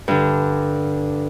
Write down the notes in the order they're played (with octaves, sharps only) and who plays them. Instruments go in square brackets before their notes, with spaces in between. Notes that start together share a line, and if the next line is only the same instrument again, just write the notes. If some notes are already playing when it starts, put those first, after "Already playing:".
[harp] G2 D3